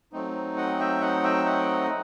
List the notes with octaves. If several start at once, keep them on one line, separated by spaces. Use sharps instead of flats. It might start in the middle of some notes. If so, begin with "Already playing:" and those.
F#3 A3 C4 D#4
D#5 F#5
E5 G5
D#5 F#5
E5 G5
D#5 F#5